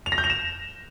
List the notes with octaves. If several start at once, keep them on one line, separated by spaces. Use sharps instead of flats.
F7
A#6
G6
F7
E7